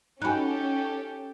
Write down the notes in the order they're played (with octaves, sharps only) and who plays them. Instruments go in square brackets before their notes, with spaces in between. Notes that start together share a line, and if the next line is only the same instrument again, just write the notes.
[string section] C#4 [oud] D#4 F#4 [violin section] G4 A4 [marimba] G#5 B5 F#6